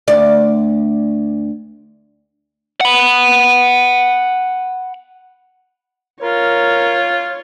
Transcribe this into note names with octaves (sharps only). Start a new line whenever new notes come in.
D2 D5
F#5 B5
F4 A#4 C#5